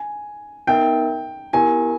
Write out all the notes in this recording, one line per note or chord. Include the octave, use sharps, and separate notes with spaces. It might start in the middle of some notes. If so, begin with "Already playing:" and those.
Already playing: G#5
B3 D#4 A#4 E5 G5
B3 E4 G4 A#4 G#5